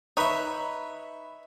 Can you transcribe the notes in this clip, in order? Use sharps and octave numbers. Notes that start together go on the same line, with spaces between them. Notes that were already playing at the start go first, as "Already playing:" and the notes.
D#4 B4 C#5 E5 B5